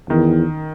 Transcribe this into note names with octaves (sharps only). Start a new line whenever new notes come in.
E2 D#3